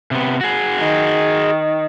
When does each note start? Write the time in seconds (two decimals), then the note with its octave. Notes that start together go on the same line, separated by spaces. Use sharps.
0.11 C3 B3
0.41 F#4 G#4
0.79 D#3